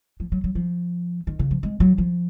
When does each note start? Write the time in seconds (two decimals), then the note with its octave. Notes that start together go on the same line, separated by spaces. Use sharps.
0.20 F3
0.32 F#3
0.44 F#3
0.55 F3
1.27 D#3
1.39 C#3
1.51 F3
1.63 G#3
1.80 F#3
1.98 F3